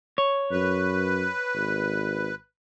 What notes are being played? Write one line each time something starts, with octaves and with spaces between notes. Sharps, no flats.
C#5
F#2 B4
G#1